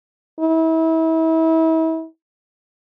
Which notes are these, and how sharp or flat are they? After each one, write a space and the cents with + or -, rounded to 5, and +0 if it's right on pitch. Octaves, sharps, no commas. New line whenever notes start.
E4 -35